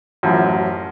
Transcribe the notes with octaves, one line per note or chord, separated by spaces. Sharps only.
A1 F#2 F3